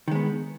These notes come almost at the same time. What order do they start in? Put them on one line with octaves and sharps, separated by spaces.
D#3 G#3 B3